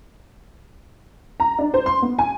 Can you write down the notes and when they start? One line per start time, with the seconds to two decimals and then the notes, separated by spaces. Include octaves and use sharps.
1.40 A#5
1.59 D4
1.74 C5
1.86 C6
2.02 B3
2.19 G#5